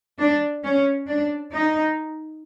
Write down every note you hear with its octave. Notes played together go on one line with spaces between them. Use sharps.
D4
C#4
D4
D#4